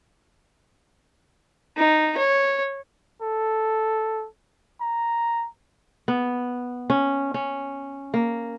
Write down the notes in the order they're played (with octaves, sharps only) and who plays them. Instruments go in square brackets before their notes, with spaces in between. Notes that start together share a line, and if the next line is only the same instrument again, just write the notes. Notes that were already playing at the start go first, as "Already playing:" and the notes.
[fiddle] D#4
C#5
[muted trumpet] A4
A#5
[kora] B3
C#4
C#4
A#3